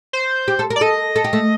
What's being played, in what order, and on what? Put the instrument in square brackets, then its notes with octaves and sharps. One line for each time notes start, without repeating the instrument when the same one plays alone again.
[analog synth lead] C5
[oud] G4
A4
A#4
[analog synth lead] D5
[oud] A4 [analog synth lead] D#5
[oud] A4
G4
A3